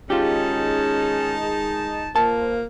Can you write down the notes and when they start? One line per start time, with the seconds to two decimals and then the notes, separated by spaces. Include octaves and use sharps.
0.10 D#3 G#3 C#4 D#4 F4 G4 G#4 A5
2.16 A#3 F4 C5 A5